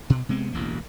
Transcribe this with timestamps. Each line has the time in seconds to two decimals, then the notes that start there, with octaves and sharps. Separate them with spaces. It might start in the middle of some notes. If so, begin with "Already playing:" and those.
0.10 B2
0.29 C3 G#3 B3 C4
0.53 E1 A1 D2 A#3